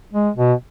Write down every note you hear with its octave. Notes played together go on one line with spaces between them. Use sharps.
G#3
B2